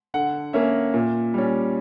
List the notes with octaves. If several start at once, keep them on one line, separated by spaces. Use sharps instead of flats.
D3 F#5
A#3 C#4 E5
A#2
G3 C#4